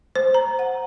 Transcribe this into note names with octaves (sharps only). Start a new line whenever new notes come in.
C5
A#5
F#5